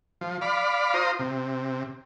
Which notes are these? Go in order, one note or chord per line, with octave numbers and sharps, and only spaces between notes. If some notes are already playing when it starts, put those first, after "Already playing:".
F3
D5 F5 B5
F4 C5 A#5 D#6
C3